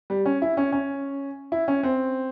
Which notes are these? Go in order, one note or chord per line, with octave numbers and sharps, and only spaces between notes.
G3
C#4
E4
C#4
C#4
E4
C#4
C4